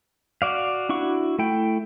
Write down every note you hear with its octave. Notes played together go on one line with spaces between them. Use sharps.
F#4 D5 F5
D4 E4 F#4 C#6
A3 E4 G5